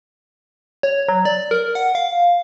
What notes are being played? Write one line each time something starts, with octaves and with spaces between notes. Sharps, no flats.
C#5
F#3
D5
A#4
F#5
F5